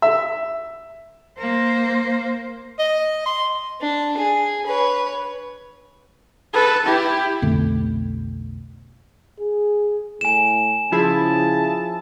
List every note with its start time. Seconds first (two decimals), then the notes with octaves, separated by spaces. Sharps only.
0.02 E5
1.38 A#3 C5
2.79 D#5
3.26 C6
3.81 D4
4.17 G#4
4.66 B4 C#5
6.53 A4 B4
6.85 E4 G4
7.42 B1 F2 D3 A3
9.40 G#4
10.21 A2 G#5 E7
10.92 C#3 F3 E4 G#4 A5